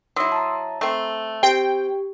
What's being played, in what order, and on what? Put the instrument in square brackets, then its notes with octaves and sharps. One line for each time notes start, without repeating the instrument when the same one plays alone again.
[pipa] F#3 E4 [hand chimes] C6 D#6 E6
[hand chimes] A5 A#5
[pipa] A3 C4
[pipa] C4 [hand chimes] G4 [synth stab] G5